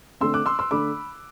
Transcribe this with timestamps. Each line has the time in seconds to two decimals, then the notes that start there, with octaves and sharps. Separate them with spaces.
0.21 D3 A3 C4 C6 E6
0.34 D6 F#6
0.46 C6 E6
0.59 C6 E6
0.71 D3 A3 D4 B5 D6